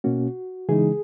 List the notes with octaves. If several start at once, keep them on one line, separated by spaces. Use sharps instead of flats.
B2 A#3 C#4 F#4
C#3 E3 G#3 D#4 G#4